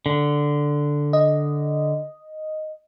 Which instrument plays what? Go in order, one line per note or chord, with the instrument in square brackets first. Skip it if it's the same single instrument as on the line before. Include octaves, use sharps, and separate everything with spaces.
[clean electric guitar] D3
[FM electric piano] D#5